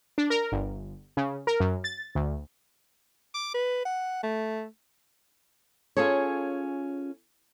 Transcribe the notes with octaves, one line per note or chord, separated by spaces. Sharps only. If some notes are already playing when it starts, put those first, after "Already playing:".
D4
A#4
G1
C#3
A#4
F#2
A6
D2
D6
B4
F#5
A3
C#4 F4 G#4 A4 C#5